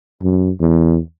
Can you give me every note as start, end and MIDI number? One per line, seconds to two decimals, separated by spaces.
0.23 0.51 42
0.60 0.98 40